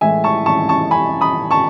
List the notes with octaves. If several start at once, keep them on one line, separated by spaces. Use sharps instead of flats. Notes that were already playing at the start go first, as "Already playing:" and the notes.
A2 E3 G#3 E5 G#5
A5 C#6
A5 C#6
A5 C#6
G#5 B5
B5 D#6
A5 C#6